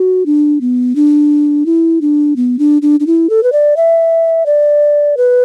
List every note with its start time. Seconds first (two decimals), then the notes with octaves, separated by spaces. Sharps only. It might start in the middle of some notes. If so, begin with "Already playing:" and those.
Already playing: F#4
0.26 D4
0.61 B3
0.96 D4
1.66 E4
2.01 D4
2.36 B3
2.59 D4
2.82 D4
3.00 D4
3.07 E4
3.30 A4
3.43 B4
3.52 D5
3.76 E5
4.46 D5
5.17 B4